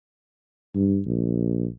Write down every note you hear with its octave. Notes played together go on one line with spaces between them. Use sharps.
G2
A#1